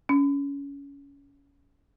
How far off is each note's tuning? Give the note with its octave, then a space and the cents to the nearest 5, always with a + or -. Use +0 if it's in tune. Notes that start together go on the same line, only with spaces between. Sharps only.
C#4 +20